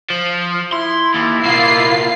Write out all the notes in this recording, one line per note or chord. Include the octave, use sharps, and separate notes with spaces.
F3
E4 C6
D#2
B2 A#3 F4 C7